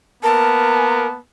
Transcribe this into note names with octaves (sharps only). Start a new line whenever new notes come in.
A#3 B3 A#4 A5